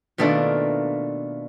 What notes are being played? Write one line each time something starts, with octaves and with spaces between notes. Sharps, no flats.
B2 D#3 A3 A#3 D4 F4